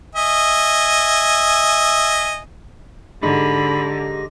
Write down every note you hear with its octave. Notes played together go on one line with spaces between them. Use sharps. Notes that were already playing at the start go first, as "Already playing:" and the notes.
D#5 E5 G#5
G#2 D3 G4 B5 A#6